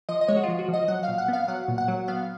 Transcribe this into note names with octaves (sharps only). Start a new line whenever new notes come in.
F3 D#5
D#5
G#3 C#5
F#4
F3 F4
F#4
F3
D#5
F#3 F#5
F5
A#2
F#5
B3 F5
F#3 F#5
A#2
F#5
F#3
B3 F5